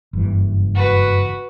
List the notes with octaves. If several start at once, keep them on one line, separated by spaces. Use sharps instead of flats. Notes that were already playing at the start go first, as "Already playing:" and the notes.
F#1 G2 E3
F#4 B4